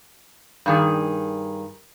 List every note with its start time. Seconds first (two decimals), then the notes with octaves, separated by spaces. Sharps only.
0.66 G2 D#3 G#4